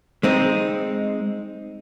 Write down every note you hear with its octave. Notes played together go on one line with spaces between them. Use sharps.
G#3 C4 D#4